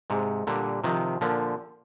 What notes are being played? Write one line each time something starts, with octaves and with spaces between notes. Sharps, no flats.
G#2 C3 G#3
A#2 D3 G3
C3 D#3 F3
A#2 D3 F3